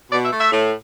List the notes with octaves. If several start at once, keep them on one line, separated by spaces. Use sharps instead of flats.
B2 D5
E5
A3
E5
A2